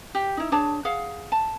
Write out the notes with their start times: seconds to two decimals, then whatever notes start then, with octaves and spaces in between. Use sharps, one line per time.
0.15 G4
0.37 D#4 E4
0.52 D4 G#4 C#5 A5
0.85 G#4 F5 F#5
1.32 A5